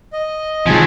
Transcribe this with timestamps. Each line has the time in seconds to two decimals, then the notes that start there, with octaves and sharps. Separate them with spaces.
0.13 D#5
0.66 C3 D#3 F3 F#3 G#3 G#5